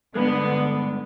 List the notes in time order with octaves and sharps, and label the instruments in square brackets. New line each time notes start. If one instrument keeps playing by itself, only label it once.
[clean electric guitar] G2 G#3 [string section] D3 B3